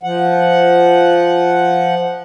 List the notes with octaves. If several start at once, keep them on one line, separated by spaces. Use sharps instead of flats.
F3 F#5